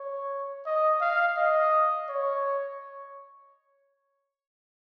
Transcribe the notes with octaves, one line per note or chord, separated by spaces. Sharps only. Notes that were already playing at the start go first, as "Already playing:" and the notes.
Already playing: C#5
D#5
F5
D#5
C#5